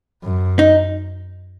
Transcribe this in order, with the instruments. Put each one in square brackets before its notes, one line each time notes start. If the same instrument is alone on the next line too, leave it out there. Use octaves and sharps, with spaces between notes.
[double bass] F#2
[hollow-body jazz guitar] D#4